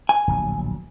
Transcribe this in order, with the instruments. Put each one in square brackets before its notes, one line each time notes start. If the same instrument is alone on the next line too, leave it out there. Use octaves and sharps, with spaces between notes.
[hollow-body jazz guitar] G#5
[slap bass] D1 A#1 F#3